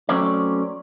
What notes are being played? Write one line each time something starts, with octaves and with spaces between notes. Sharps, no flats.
F#3 A3 C4 C#4 D5